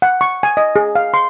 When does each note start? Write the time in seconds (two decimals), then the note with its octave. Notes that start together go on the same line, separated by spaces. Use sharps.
0.02 F#5
0.21 C#6
0.43 G#5
0.57 D#5
0.76 G#4
0.95 F5
1.14 C6